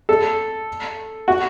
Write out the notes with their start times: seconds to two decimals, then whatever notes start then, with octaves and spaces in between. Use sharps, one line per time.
0.09 A4
1.28 F#4